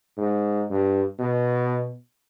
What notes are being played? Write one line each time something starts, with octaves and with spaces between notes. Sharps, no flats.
G#2
G2
B2